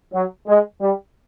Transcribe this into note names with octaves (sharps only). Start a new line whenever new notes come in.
F#3
G#3
G3